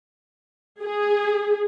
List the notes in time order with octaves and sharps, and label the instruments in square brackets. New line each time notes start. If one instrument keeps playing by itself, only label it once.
[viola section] G#4